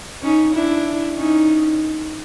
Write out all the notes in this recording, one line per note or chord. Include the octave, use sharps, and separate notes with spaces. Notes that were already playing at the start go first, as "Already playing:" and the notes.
C#4 D#4
D4 E4
C#4 D#4